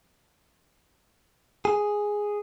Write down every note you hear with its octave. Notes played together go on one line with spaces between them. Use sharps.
G#4